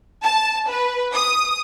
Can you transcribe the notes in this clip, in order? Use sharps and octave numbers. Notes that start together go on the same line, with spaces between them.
A5
B4
D#6